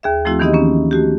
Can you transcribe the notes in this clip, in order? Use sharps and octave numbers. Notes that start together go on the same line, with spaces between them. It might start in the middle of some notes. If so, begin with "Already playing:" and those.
D#2 G#4 E5
F3 A3 C4 E4 F#4
D#3 E3 B3 D#4 G4 D#5
A#3 C#4
A3 F#4 G4